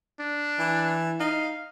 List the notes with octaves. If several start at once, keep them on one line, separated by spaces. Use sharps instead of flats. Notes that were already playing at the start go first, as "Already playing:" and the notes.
D4
E3
D#4 F5